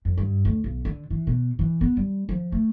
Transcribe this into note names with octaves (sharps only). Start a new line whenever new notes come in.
F2
G2
D2
B1
D3
E3
B2
E3
B3
G3
F3
A3